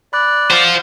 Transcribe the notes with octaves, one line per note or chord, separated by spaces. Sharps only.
D5 B5 F#6
F4 C5 F#5